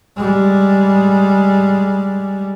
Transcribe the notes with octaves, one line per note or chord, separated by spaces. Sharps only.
G3 G#3